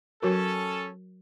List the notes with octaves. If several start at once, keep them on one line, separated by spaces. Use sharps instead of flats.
F#3 C#4 F#4 A4 A#4